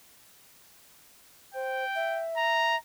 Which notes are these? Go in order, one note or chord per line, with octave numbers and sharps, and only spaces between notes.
C5 G5
E5
A#5